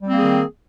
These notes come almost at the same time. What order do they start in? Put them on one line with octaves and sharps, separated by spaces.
G3 C4 A#3 G#4 D#3